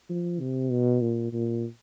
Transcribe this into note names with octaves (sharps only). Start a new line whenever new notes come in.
F3
C3
B2
A#2
A#2